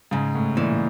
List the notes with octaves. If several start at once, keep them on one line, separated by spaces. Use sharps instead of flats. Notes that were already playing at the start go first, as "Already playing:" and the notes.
G#2 C#3
A2
A#2 E3